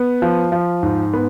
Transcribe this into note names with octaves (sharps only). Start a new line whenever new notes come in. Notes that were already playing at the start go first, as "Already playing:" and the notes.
Already playing: B3
F3
F3
G#2
B3